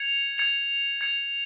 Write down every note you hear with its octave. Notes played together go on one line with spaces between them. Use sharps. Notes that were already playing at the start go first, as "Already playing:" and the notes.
Already playing: G#6 C#7 F7
G#6 C#7 F7
G#6 C#7 F7